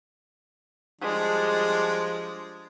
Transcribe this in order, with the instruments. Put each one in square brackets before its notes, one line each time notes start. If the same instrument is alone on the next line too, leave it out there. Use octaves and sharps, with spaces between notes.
[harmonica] F3 G3 D4 [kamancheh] G#3